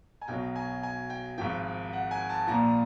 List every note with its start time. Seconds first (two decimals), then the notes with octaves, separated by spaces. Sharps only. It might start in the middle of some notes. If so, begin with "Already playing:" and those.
0.21 G#5
0.28 B1 B2 F#3 G5
0.56 G#5
0.83 G#5
1.10 G5
1.38 G#1 G#2 F3 G5
1.93 F#5
2.11 G#5
2.30 A5
2.47 A#1 A#2 F3 A#5